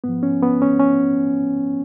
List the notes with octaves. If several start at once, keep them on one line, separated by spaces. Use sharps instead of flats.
G#2 F3 B3
C#4
B3
C#4
C#4